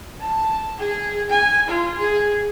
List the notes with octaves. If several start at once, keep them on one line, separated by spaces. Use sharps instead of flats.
A5
G#4
G#5
F4
G#4